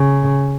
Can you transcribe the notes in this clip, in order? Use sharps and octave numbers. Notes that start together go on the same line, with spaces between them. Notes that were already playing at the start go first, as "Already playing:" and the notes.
Already playing: C#3